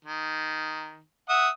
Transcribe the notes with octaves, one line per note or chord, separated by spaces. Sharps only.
D#3
E5 F#5 D#6